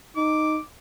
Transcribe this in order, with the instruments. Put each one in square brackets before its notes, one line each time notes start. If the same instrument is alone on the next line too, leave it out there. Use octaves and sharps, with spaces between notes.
[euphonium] D#4 [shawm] D6